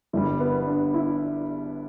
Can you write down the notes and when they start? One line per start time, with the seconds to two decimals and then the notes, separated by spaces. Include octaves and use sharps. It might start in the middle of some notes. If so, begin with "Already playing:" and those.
0.13 G1 G2 G3 E4
0.40 B3
0.67 D4
0.94 E4